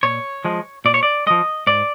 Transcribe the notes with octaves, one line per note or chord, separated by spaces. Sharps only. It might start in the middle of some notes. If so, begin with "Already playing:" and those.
A#2 C#5
F3 G#3
A#2 D5
C#5
D5
F3 G#3 D#5
G#2 D5